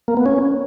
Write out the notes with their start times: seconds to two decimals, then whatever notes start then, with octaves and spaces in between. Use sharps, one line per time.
0.08 A#3
0.17 B3
0.26 C#4